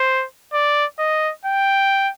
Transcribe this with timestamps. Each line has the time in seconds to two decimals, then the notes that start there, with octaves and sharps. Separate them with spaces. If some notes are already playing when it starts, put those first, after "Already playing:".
Already playing: C5
0.53 D5
0.99 D#5
1.46 G5